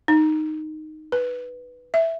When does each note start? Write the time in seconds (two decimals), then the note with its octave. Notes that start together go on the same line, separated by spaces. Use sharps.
0.08 D#4
1.12 B4
1.94 E5